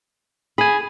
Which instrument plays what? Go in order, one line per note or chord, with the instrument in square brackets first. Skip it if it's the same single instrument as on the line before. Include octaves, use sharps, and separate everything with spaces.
[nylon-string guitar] G#4 [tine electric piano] G#5 B5